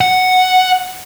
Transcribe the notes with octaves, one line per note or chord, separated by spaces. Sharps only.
F#5